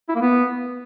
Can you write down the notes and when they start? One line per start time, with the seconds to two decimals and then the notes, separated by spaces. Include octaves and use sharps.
0.09 E4
0.15 A#3
0.22 B3